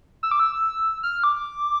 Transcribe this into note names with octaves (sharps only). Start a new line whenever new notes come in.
E6
D6
E6
F6
D6